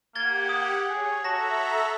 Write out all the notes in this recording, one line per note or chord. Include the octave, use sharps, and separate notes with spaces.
A#3 G4 F#5 G#6 A6 G7
D#6
G#4 C#5
F#4 A4 E5 A5 A#5 A#6